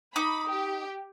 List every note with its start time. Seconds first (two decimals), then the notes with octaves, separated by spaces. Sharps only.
0.16 D#4 B5 D6
0.48 G4